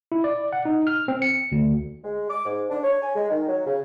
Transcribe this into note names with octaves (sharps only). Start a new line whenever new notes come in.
E4
D5
F#5
D#4
F6
C4
C#7
D2
G#3
D6
G#2
D4
C#5
G#5
G#3
D#3
F#3
C#3